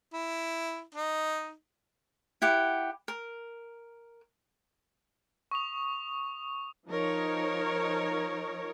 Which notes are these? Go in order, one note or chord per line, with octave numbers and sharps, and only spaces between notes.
E4
D#4
E4 G4 F#5
A#4
C#6 D#6 F7
F3 D#4 A#4 C#5